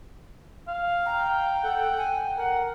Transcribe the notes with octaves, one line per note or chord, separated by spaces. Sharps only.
F5
G5 A#5
A4 F#5
G#5
A#4 F#5